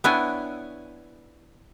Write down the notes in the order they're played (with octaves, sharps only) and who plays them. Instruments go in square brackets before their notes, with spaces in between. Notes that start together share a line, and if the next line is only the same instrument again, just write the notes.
[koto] B3 D4 E4 C#5 G5 G#5